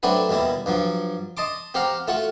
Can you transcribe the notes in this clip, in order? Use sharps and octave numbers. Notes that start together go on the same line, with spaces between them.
F#3 A3 C4 D4 F#4 B4
D#2 B2 G3 E4
G2 F3 F#3
D#5 A5 C6 D6
C4 G4 F5 F#5 A#5
A3 F4 F#4 F#5